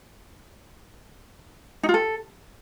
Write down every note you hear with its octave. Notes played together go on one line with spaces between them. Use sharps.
D#4
F4
A4